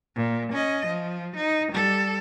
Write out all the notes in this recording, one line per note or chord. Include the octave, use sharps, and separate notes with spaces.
A#2
C#4 D#5
F3
D#4
G3 A4